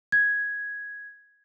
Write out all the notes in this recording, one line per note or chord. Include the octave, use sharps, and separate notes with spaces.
G#6